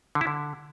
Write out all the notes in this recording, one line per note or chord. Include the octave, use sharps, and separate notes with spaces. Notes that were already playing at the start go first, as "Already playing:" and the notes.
D3
E4
D3